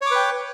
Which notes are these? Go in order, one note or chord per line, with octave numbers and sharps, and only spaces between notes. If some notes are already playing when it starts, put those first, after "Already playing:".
B4 C#5 G5 D6